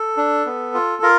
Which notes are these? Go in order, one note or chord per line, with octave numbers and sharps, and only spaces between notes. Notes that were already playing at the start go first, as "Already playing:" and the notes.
Already playing: A4
D4
B3
F4
F4 A#4